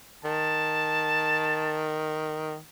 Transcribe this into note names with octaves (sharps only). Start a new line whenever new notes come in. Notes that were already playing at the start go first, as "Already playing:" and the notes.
D#3 A5